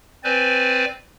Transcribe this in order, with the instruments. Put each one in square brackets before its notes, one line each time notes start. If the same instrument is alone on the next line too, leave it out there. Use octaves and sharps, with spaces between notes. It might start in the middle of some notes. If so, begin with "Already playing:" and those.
[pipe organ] C4 B4 C5 D5 G#5